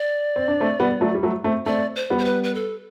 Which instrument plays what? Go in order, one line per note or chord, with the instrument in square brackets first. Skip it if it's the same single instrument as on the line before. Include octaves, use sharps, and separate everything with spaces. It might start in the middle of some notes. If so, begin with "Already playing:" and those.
Already playing: [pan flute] D5
[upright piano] C4
D4
A3 C4
G3 B3
F#3 A3
G3
F#3 A3
A3 C4
[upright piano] A3 C4 [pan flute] D5
[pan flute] C5
[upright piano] G3 B3
[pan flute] C5
B4
B4
A4